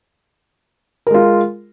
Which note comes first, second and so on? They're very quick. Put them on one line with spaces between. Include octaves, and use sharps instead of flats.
A#4 G#3 F4